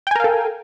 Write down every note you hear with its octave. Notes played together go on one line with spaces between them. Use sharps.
A4 A#4 F5 G5 G#5